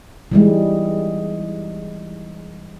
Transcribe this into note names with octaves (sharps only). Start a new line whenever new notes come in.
E3 G3 G#3